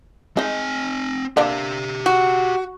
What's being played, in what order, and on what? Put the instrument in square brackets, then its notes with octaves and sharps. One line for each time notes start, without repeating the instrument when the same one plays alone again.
[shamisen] G#3 D#4 [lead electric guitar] C4 G#5
[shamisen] D3 A#3 D4 [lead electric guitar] G4 E5
[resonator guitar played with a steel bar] F#4